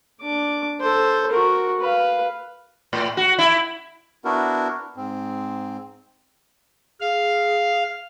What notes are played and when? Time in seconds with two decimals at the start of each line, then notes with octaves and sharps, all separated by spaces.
0.21 D4 D6
0.80 A4 C5
1.31 F#4 A#4
1.80 B4 F5
2.93 A2
3.17 F#4
3.39 E4
4.25 B3 D4 E4 F#4 A#4
4.96 G#2 C4
7.01 G#4 F5